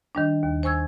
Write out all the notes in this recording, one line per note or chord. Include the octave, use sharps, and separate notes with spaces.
D#3 G3 D4
D#2
C5 G#5 C#6 E6 G#6